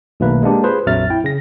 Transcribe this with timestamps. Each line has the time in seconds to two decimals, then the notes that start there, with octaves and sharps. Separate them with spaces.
0.20 B1 B2 D#3 A3 A#3 B4
0.43 G#3 A#3 D4 G4
0.64 F4 G#4 B4 C5
0.86 A#1 F2 F#3 E5 F6 A6
1.10 E4 G5
1.24 C#3 A#6